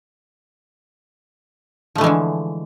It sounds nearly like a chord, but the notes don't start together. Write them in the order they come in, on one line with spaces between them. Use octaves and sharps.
F3 A3 E3 G#3 D3